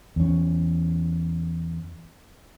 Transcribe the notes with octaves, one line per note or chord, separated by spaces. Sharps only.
E2 C#4